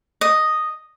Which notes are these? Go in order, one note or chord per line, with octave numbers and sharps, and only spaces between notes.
D#5